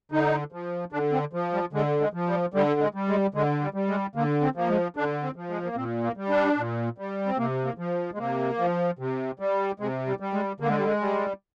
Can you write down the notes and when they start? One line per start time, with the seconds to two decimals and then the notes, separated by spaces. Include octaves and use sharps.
0.11 D3 D#4
0.52 F3
0.92 D3 D4
1.12 C4
1.33 F3
1.53 G3
1.73 D3 G#3
2.00 G#3
2.14 F3
2.27 G3
2.54 D3 G3
2.80 G#3
2.94 G3
3.08 G#3
3.34 D3 G#3
3.61 G3
3.74 G3
3.88 G#3
4.15 D3 A#3
4.42 C4
4.56 F3 A#3
4.69 G#3
4.96 D3 D4
5.23 C4
5.36 F3
5.50 G#3
5.64 A#3
5.76 A#2 C4
6.04 A#3
6.17 G3
6.30 D4
6.57 A#2
6.98 G3
7.26 C4
7.38 C3 A#3
7.65 A#3
7.78 F3
8.14 G#3
8.18 C3 A#3
8.59 F3
8.99 C3
9.40 G3
9.80 C3 G#3
10.07 G3
10.20 G3
10.33 G#3
10.60 D3 A#3
10.68 G#3
10.77 G3
10.85 G#3
11.01 G3